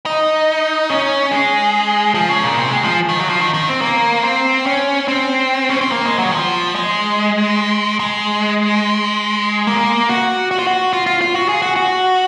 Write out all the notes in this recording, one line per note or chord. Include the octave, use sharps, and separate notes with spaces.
D#4
C#4
G#3
F3
C#3
A#2
C3
G#3
F3
D#3
F#3
F3
D#3
D#3
C4
A#3
C4
C#4
C4
C#4
C4
A#3
G#3
F#3
D#3
F3
G#3
G#3
A#3
F#4
F#4
F4
F#4
F4
F4
F4
F#4
G#4
F#4
F#4